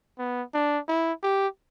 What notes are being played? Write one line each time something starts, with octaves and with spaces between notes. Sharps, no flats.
B3
D4
E4
G4